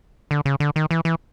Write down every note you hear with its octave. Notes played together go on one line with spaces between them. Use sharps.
D3
C#3
D3
D#3
E3
E3